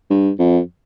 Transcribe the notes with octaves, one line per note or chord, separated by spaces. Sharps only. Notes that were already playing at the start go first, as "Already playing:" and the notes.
G2
F2